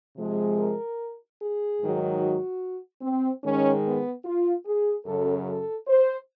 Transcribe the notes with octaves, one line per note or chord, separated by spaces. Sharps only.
C3 F3 G#3
A#4
G#4
G#2 D#3 F#3
F#4
C4
G#2 D#3 G#3 C#4
B3
F4
G#4
F#2 C#3 F#3 A4
A4
C5